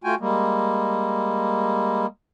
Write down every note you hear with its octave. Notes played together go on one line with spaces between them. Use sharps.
A3 F4 F#4 G5 G#5
G3 G#3 A#3